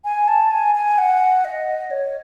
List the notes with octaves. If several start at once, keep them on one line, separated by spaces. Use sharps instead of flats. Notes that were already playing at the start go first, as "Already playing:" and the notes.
G#5
A5
G#5
G#5
F#5
D#5
C#5